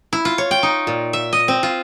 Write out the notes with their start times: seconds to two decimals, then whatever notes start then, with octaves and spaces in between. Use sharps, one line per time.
0.13 E4
0.25 F4
0.38 C#5
0.51 G5
0.63 D#4
0.87 A#2
1.13 E5
1.33 D#5
1.48 C4
1.63 F4